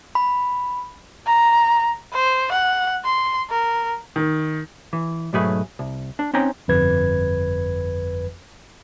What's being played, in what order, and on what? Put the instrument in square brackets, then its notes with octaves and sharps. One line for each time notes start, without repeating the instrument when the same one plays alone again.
[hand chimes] B5
[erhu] A#5
C5
F#5
C6
A#4
[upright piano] D#3
[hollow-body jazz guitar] E3
B1 G#2 F#3 A3 G#4 B4
C2
D4
C4 C#4 D#4 G5 A#5
[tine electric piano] G1 F2 B4 G#6